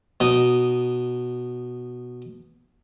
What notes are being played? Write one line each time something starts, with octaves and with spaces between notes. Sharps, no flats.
B2 D#4